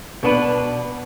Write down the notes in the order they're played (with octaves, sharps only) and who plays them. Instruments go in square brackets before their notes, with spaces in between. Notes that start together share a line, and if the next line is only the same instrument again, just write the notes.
[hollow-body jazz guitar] B2 B3 D4 B4